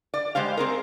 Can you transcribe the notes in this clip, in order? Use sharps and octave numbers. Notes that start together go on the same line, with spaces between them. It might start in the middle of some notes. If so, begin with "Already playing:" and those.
D5
G#3 G4 C5 F5
C4 G#4 A#4